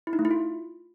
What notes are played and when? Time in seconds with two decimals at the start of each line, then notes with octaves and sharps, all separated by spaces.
0.07 E4
0.13 D#4
0.19 A3
0.25 E4
0.31 F4